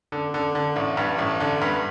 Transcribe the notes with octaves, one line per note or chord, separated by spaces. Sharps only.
D3
D3
D3
A1
G2
A1
D3
G2